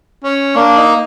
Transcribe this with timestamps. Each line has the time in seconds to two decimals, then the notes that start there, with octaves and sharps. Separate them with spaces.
0.24 C#4
0.56 A#3 D4
0.77 D#4